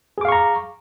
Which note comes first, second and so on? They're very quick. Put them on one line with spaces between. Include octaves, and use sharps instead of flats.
G#4 D6 F5 C#6 A#5